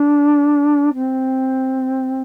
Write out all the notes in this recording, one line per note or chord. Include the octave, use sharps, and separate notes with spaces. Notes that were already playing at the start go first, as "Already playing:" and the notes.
Already playing: D4
C4